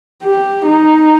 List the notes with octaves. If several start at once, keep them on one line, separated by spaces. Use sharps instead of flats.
G4
D#4